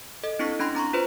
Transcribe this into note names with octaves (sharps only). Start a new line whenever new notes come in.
A4 D#5
C4 D4 E4 C#6 B6
C#4 D4 B5 C6 A#6
C4 A#5 C6 C#6
F4 B4 C5